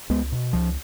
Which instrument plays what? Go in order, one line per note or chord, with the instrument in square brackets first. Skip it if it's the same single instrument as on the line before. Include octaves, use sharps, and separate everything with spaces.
[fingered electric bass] C#2 G#3 B3
B2
C#2 F3